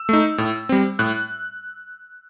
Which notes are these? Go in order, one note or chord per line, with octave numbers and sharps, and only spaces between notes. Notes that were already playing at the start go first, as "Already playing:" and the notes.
Already playing: E6
A3 D#4
A2
G3 C4
A2 F#6